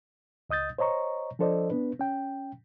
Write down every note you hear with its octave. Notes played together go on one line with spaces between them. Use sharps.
C#2 D#5 D#6 G6 A6
C5 C#5 D#5 A#5 C#6
F3 D4 A4 C5 D5 D#5
B3 D4 B4
C#4 G5